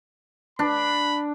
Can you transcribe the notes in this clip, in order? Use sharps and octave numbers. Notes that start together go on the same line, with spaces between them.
D4 B5